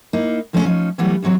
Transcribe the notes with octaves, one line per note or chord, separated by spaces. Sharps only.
A#3 D#4 E4
F2 F3 G#3 A3 C4 C#4
F3 C#4 D#4
E3 F#3 G3 A3 B3 E4
E2 E3 F#3 C4 C#5